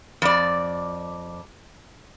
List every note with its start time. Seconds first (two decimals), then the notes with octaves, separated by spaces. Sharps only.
0.22 F2 D5